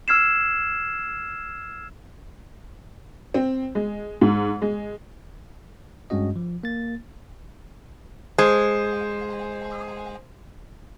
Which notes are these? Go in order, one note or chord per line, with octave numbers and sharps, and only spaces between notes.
E6 F6 G#6 C7 E7
C4
G#3
G#2
G#3
G2 G#3 C#4 F#4 D#5
F3
A#3 A6
G#3 C5